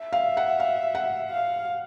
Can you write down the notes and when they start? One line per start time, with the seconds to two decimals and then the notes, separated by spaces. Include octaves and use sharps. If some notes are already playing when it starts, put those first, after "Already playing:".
Already playing: E5
0.13 F5
0.37 F#5
0.60 F5
0.95 F#5
1.31 F5